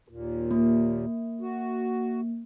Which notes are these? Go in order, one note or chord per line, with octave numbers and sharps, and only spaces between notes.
D#2 A#2
A#3
F#4